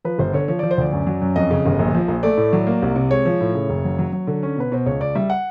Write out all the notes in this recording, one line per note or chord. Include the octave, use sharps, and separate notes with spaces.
F3 B4
G1 C5
D3 C#5
F3 C#5
F3 D5
C5
D2 D5
F#2
F#3
F#2
F2 D#5
C#3
G1
A#1
F3
A#1
A3 D5
A2
F#3
A#3
C2
C3
G#3 C#5
F3
A2
C#3
F#1
F#3
F#3
F#3
D3
C#4
B2 B4
B2 C5
C#2 C#5
C#2 D5
G3 E5
F#5